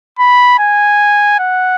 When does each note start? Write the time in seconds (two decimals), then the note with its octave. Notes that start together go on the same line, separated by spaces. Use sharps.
0.19 B5
0.59 G#5
1.40 F#5